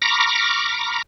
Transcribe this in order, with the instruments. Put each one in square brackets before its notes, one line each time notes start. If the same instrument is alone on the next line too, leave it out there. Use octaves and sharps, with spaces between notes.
[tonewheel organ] A#5 B5 C#6 D6 F6 A#6